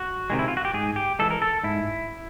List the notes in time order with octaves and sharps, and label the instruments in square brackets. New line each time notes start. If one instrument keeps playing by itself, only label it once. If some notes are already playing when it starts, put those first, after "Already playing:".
Already playing: [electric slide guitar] F#4
C3 D#3 G#3
E4
F4
F#4
G4
G#2 G#4
G4
E3 G#3 A4
A#4
A4
G#2 E4